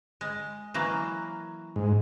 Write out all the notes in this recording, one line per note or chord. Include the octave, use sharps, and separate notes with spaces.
G#3
E3 F#3 A#3
G#2